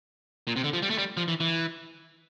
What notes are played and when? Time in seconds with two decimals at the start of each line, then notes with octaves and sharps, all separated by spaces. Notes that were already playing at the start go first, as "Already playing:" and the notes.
0.47 A#2
0.56 C3
0.64 D3
0.73 F3
0.82 G3
0.90 A3
0.98 G3
1.17 F3
1.28 E3
1.40 E3